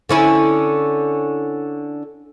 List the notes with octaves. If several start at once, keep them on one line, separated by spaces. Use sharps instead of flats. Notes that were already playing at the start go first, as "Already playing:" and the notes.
D3 C#4 E4